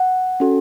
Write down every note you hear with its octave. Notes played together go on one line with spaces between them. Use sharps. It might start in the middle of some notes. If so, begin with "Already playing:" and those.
Already playing: F#5
C#4 F#4 A4